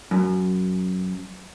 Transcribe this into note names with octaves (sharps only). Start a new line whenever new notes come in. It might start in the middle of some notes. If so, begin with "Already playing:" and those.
F#2